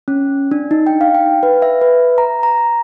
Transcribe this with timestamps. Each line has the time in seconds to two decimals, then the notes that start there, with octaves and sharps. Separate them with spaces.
0.08 C#4
0.51 D4
0.71 D#4
0.87 G5
1.01 F5
1.14 G5
1.43 B4
1.62 E5
1.81 B4
2.18 A#5
2.43 A#5